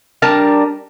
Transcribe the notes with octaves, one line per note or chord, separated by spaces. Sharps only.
G3 D4 A#4 A5